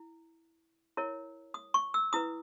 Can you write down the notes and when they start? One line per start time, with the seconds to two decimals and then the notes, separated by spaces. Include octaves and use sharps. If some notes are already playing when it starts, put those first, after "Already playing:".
Already playing: E4
0.97 E4 A#4 C#5
1.54 D#6
1.74 C#6
1.94 E6
2.13 E4 B4 D#6